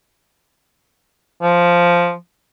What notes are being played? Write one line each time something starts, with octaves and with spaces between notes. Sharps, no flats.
F3